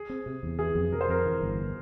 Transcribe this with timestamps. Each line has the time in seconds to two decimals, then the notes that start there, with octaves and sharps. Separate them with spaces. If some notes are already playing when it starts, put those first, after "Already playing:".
Already playing: G#4
0.09 C4
0.26 C3
0.43 E2
0.59 E3 G#4
0.75 F2
0.92 C3 A#4
1.01 C5
1.09 F2 A#4
1.25 E3
1.41 G1